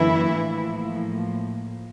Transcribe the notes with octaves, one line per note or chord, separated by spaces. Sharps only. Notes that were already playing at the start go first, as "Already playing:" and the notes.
Already playing: F#2 D3 E3 F#3 A#3 E4
A2 F3 A#3